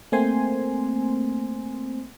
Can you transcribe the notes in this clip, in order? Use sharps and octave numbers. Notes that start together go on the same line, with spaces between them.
A3 A#3 C4 C5 G#5 C6